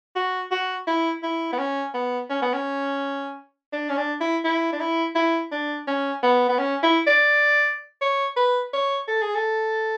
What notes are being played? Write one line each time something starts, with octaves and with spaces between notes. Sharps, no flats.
F#4
F#4
E4
E4
B3
C#4
B3
C#4
B3
C#4
D4
C#4
D4
E4
E4
D4
E4
E4
D4
C#4
B3
B3
C#4
E4
D5
C#5
B4
C#5
A4
G#4
A4